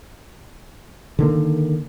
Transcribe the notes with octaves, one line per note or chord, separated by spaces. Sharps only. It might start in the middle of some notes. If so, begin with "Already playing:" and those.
D3 D#3 A#3